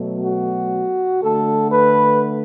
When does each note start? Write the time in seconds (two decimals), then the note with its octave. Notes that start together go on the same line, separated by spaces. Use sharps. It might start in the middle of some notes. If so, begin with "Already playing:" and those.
Already playing: B2 F#3 A3
0.25 F#4
1.22 D3 A3 A4
1.71 B4